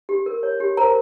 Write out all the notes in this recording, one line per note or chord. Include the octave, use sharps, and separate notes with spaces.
G4
A#4
C#5
G4
A#4 C5 A#5